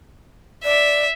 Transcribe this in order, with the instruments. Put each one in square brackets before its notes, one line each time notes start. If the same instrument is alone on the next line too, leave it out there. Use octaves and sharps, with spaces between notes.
[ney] D5 [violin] E5